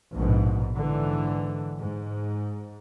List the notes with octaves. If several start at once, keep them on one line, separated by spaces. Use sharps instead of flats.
A#1 G#2 B2
G#2 D3 E3
G#2